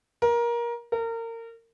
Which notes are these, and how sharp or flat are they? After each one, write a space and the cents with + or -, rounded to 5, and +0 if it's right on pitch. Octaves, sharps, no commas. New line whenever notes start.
A#4 +20
A#4 -30